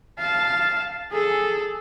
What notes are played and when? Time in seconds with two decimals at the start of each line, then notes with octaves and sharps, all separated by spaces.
0.19 F5 A5
1.12 G#4 A4